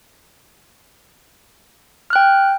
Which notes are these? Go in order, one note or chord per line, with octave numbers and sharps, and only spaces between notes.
G5 F6 F#6